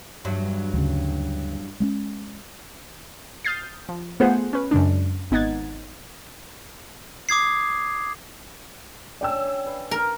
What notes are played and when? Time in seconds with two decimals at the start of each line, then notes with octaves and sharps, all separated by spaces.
0.25 E2 G2 F#3
0.74 D2 C#3
1.80 G#3 A3 C#4
3.45 D#6 F6 G6 A6 C7
3.89 F3
4.20 A3 B3 F4 G#4 C5 F#5
4.53 C#4 B4
4.71 F#2 C#3 G#3 D4
5.31 G#1 B3 D#4 F#5 G#6 A6
7.29 D6 D#6 G#6 C7
9.21 C#4 D4 D5 G5 G#5 E6
9.66 B4 F5
9.91 A#4